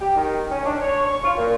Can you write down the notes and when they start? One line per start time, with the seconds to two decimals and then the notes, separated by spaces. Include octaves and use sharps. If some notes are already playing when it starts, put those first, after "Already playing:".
0.01 G4
0.16 D#3
0.51 C#4
0.66 D4
0.81 C#5
1.06 C#6
1.24 F4
1.38 A#2